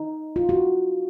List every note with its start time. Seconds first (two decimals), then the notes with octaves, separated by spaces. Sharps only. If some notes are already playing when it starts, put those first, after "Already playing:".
Already playing: D#4
0.36 F4
0.49 F#4